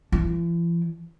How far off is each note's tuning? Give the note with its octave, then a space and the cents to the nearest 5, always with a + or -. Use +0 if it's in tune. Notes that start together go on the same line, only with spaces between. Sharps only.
E3 +45